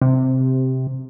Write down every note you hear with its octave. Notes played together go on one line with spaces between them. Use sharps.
C3